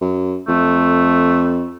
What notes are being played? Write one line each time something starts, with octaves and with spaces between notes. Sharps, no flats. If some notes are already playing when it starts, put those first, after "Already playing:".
F#2
F2 A3